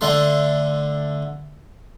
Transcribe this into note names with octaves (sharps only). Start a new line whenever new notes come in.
D3 A3 C6